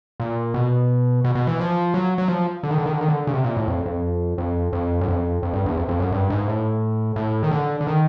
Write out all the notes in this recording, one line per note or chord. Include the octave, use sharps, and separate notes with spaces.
A#2
B2
B2
B2
E3
F3
F#3
F#3
F3
D3
D#3
D3
D#3
D3
D#3
D3
C#3
C3
A#2
A2
F2
F2
F2
F2
F#2
F2
F2
G2
E2
F2
F2
F#2
G2
G#2
A2
A2
D#3
D3
D3
D#3